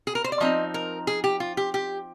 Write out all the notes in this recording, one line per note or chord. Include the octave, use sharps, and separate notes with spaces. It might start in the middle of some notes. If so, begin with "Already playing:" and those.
G#4
A#4
C5
D5
F3 C4 D#4 D#5
A#4
G#4
G4
F4
G4
G4